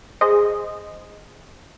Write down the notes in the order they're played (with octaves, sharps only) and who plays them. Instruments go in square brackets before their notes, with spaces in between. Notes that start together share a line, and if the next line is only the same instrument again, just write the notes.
[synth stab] G#4 C5 D#5